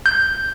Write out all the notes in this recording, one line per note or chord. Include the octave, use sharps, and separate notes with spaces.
G6